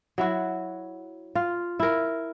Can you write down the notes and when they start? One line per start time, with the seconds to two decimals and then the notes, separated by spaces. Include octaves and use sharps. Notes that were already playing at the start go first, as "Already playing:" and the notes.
0.18 F#3 E4 F#4
1.35 F4
1.80 E4 A#4